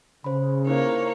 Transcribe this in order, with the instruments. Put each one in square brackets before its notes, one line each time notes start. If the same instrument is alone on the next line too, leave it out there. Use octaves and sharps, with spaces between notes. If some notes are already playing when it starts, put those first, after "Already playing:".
[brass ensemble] C#3 [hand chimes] C5 B5
[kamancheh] A#3 C#5 [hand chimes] D#4 E4 C5